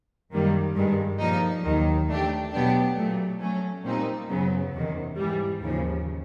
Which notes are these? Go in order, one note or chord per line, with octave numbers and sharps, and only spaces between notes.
F#2 D#3 G3 A#3
G2 D#3 G#3
A#2 F3 A#3 D#4
D#2 D#3 F#3
E3 A3 D4 G4
B2 F#3 B3 D4 G4
A#2 F#3 A3
F#3 A3 C#4
A#2 G3 C4 D#4
F#2 C#3 F#3 B3
E2 C3 D#3
G#2 E3 G3
D#2 C#3 F3